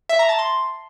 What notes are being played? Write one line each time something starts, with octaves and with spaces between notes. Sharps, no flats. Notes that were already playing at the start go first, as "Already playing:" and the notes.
E5
A#5
A5
C6